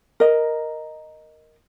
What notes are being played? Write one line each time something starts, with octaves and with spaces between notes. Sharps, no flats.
A#4 D#5